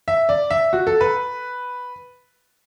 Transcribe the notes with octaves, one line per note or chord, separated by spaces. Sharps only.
E5
D5
E5
F#4
A4
B4